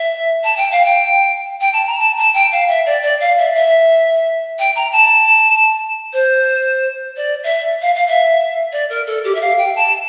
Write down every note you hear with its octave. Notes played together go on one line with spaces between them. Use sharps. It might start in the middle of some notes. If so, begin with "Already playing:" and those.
Already playing: E5
A5
G5
F5
G5
G5
A5
A#5
A5
A5
G5
F5
E5
D5
D5
F5
E5
E5
G5
A#5
A5
C5
D5
E5
F5
F5
E5
D5
A#4
A4
G4
E5
F5
G5
A5